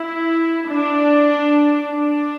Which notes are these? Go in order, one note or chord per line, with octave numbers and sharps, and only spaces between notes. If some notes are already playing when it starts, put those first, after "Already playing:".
Already playing: E4
D4
D4